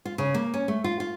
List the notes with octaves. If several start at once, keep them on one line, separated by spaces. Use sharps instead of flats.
F4
C#3
A#3
C#4
A3
F4
F4